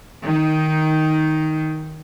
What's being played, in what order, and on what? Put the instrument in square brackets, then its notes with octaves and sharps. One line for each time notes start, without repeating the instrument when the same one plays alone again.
[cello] D#3 D#4